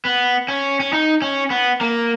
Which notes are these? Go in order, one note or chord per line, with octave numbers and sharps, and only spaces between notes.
B3
C#4
C#4
D#4
C#4
B3
A#3